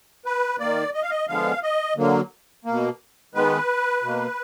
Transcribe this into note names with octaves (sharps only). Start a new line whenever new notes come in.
B4
D#3 A#3 D5
D#5
F5
D#5
D3 F3 G#3 B3 F5
D#5
D3 F#3 A#3
B2 A#3
D#3 G#3 B3 B4
B2 A#3